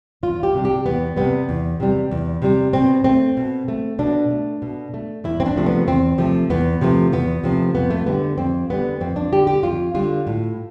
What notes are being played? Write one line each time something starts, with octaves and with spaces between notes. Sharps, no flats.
E2 F4
G4
C3 G3
G4
E2 B3
C3 G3 B3
E2
C3 G3
E2
C3 G3
B2 C4
A3 C4
B2
A3
B2 D4
A3
B2
A3
E2 E4
C4
D4
C3 F3 A3
B3
E2 C4
C3 F3 A3
E2 B3
C3 F3 A3
E2 B3
C3 F3 A3
F2 B3
A3
D3 G3 B3
F2 C4
D3 G3 B3
F2 C4
D4
D3 G3 G4
G4
F2 F4
D3 G3 F4
A2